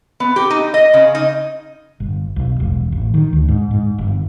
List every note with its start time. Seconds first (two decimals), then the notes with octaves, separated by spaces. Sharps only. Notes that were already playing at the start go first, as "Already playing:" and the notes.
0.20 B3
0.36 G4
0.50 D#4
0.74 D#5
0.94 C#3
1.15 D#4
2.00 G1
2.36 B1
2.60 E1
2.92 A1
3.14 D#3
3.33 D2
3.48 G#2
3.71 G#2
3.99 G1